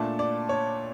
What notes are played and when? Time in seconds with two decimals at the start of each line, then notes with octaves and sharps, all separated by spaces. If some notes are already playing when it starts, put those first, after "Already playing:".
Already playing: A#2 A3 D4 A5
0.19 D5
0.49 C#5